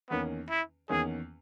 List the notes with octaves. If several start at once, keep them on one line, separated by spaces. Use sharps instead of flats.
E2 D#3 A#3 B3 C#4
E4
E2 D#3 A#3 C#4 G#4